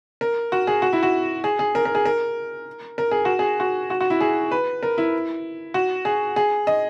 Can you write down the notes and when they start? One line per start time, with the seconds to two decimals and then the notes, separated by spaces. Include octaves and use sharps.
0.21 A#4
0.52 F#4
0.67 G#4
0.82 F#4
0.93 E4
1.03 F#4
1.44 G#4
1.59 G#4
1.75 A#4
1.85 A#4
1.95 G#4
2.05 A#4
2.98 A#4
3.11 G#4
3.25 F#4
3.39 G#4
3.60 F#4
3.90 F#4
4.01 F#4
4.10 E4
4.20 G#4
4.51 B4
4.83 A#4
4.98 E4
5.74 F#4
6.05 G#4
6.36 G#4
6.67 D#5